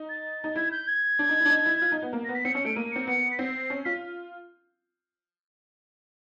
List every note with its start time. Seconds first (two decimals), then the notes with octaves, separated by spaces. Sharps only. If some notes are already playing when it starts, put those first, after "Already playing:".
Already playing: D#4
0.08 A6
0.44 D#4
0.55 E4 G#6
0.71 G6
0.87 G#6
1.19 D4
1.29 D#4
1.40 E4
1.45 D4
1.49 D#4
1.65 E4
1.81 F4
1.92 D#4
2.02 B3
2.13 A#3
2.24 B3 A#6
2.34 B6
2.44 C4 C#7
2.55 C#4 C#7
2.65 A3 D7
2.76 A#3 D#7
2.91 C4 C#7
3.07 B3
3.31 B6
3.39 C4 C7
3.70 C#4
3.85 F4 B6